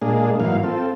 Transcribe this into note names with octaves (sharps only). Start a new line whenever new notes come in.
A#2 G#3 A#3 D4 G#4
G#2 E3 F#3 A#3 F5
C4 F4 A4